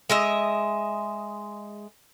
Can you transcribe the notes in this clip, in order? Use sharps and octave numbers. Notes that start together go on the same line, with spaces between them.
G#3 D#5 E5